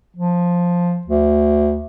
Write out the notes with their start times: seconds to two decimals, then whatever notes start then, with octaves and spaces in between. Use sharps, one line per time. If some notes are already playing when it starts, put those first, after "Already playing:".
0.17 F3
1.07 D2